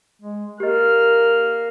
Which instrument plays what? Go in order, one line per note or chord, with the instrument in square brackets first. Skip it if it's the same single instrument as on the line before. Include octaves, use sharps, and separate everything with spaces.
[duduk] G#3
[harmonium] A#3 [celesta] G4 D#5 [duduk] A#4 [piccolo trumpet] F6